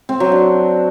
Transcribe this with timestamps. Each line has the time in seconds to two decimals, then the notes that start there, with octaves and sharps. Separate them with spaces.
0.09 C4
0.20 F#3
0.32 D4